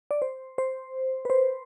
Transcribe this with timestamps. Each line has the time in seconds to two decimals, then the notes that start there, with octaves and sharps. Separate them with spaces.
0.11 D5
0.22 C5
0.58 C5
1.25 B4
1.30 C5